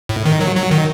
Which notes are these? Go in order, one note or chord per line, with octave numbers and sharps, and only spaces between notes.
A2
D#3
F#3
F#3
D#3